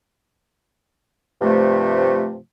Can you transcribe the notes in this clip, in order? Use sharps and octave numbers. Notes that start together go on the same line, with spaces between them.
G2 C3 F3 A3